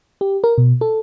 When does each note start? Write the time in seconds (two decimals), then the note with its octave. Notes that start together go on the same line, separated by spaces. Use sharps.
0.21 G4
0.44 A#4
0.58 B2
0.81 A4